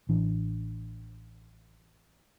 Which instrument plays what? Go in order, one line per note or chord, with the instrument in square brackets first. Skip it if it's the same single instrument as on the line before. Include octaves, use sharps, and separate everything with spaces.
[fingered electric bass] A1 E3 D4